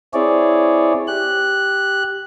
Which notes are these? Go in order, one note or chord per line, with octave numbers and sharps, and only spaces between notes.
C4 E4 G#4 C#5 D5
G4 F#6